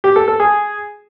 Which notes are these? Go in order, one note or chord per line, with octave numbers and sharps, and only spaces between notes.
G4
A4
A4
G#4